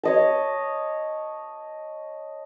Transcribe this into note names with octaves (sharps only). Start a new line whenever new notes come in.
C#5 D#5 A5